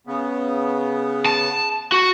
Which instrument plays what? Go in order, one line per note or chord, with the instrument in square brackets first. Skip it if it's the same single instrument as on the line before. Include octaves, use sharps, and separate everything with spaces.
[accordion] C#3 B3
[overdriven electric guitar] A5
F#4